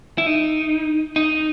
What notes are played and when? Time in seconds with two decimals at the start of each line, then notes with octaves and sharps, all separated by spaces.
0.18 E4
0.27 D#4
1.16 D#4